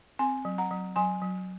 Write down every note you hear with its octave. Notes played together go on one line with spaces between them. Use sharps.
C4 G#5 C6
F#3
F#5 A#5
F#3
F#3 G#5 C6
F#3